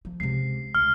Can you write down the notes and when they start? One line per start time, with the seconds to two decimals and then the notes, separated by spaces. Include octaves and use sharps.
0.05 F3
0.20 C#2 C3 C7
0.75 C#2 F6